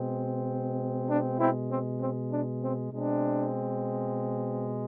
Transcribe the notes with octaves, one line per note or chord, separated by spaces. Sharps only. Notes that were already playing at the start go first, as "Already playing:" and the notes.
Already playing: B2 G#3 C4
D4
C4 E4
C4
C4
D4
C4
B2 G#3 C4 D4